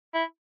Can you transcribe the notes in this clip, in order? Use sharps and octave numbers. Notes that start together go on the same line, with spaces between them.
E4